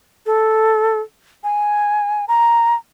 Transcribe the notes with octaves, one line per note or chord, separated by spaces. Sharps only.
A4
G#5
A#5